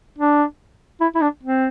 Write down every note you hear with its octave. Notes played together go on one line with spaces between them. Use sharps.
D4
E4
E4
D4
C4